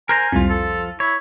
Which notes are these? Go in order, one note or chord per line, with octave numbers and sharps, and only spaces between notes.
A#4 C5 G#5 A#5
C2 F2 F3 F4
A4
E4 C#5